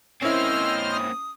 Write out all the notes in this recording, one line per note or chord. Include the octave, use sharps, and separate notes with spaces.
A#3 C4 C#4 E4 C5 D#5 E6 F6
D#6